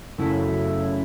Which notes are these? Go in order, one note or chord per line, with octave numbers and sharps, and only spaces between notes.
F#2 C#3 F#3 A3 E4